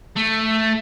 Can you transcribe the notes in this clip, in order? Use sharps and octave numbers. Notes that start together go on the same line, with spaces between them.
A3